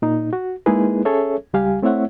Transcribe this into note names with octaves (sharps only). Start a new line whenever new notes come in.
A#2 D#4
F#4
G#3 A#3 D#4 E4 G#4 B4
C#4 G#4 A4 C#5 E5
C#2 G3 G4 F5 G#5
A3 C4 E4 C#5 E5 F#5